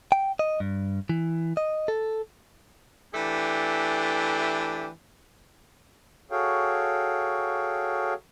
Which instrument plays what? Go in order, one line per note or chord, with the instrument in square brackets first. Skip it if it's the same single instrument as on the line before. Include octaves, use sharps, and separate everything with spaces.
[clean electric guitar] G5
D#5
G2
E3
D#5
A4
[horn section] E3 A3 D4 G4
[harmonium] F#4 G#4 A4 C#5 F5 G5